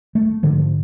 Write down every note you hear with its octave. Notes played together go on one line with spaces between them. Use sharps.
A3
G#2 D3 F3